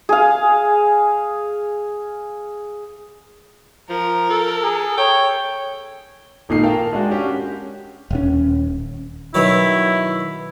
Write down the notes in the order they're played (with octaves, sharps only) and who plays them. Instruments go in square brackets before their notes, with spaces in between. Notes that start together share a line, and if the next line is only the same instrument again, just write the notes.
[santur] G#4 F5
[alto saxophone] F3 [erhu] A#4
[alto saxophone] A4
[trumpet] G#4
[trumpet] C#5 [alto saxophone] G5
[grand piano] G#1 A#2 D#4 A4 C7
A#4 F5 G5 A5
G#3 D4 F#4
C#4 G4
[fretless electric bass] D#1 C#4
[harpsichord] B2 D#3 F#3 [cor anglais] E4